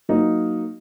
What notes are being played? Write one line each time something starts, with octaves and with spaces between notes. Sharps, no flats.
F#3 A#3 D#4